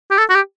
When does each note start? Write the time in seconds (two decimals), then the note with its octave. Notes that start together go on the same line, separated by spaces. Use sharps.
0.11 G4
0.18 A4
0.29 F#4
0.35 G4